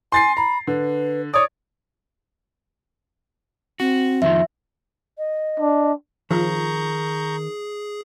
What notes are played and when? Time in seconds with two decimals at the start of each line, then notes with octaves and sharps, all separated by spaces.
0.12 G#5 C6 A6 C7
0.37 A#5 B5
0.67 D3 B4
1.34 C#5 D5 D#6
3.80 C4 F#4
4.22 F2 D#3 F3 E5
5.18 D#5
5.60 D4
6.31 D#3 F3 G#4 A#5 C#6 G6